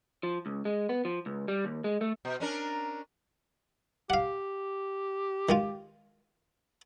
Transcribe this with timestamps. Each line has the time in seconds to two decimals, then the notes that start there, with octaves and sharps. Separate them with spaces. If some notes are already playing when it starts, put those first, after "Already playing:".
0.23 F3
0.46 C#2
0.65 G#3
0.89 B3
1.05 F3
1.26 C#2
1.48 G3
1.65 D#2
1.84 G#3
2.01 A3
2.25 B2
2.40 C#4 D4 A#4
4.10 G4 F5 F#5
5.49 D#3 G#3 F4